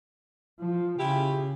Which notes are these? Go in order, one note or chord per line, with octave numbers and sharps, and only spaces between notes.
F3
C#3 E4 F4 G4